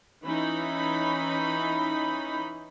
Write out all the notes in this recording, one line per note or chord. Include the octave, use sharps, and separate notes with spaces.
E3 C#4 D#4 B5